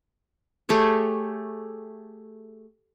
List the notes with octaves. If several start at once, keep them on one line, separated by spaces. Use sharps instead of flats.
A3 G4 G#4 C#5